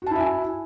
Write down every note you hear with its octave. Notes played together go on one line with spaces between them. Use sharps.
E4 F#4 E5 G#5 A5